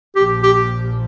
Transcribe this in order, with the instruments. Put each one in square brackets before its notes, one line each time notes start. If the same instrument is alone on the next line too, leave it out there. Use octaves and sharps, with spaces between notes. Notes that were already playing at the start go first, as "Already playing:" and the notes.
[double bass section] A#1 A#2 F3 [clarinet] G4
[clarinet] G4